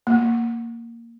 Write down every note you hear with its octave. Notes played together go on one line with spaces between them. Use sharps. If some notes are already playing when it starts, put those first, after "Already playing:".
A#3